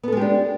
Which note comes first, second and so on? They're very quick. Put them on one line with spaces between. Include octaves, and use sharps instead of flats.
B3 A4 G#3 G4 D4